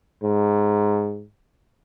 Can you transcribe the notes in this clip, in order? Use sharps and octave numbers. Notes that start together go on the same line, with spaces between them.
G#2